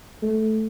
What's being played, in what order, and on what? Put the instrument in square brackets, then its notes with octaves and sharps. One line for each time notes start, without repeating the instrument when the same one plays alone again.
[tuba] A3